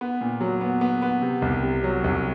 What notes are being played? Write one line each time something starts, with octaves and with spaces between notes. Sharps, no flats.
B3
A#2
F#3
B3
B3
B3
C3
C2
C3
F#3
C2